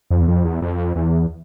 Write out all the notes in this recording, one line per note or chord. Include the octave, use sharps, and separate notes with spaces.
F2
E2
F2
E2
F2
E2